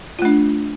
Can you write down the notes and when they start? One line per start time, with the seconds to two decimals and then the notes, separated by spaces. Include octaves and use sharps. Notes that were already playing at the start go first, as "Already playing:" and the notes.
0.19 F4
0.22 A3
0.25 D4